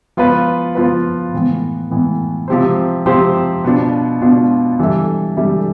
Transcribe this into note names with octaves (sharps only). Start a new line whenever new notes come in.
F3 B3 F4 B4
F3 B3 F4 B4
A2 E3 B3
A2 E3 B3
C3 F3 C4 G4 C5
C3 F3 C4 G4 C5
B2 B3 D4 F4
B2 B3 D4 F4
E3 G3 D4 A4 E5
E3 G3 D4 A4 E5